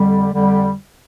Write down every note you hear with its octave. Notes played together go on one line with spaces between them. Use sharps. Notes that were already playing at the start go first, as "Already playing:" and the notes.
Already playing: F2 D3 G3
F2 D3 G3